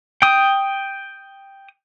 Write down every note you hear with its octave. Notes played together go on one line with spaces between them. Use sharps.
G5 D#6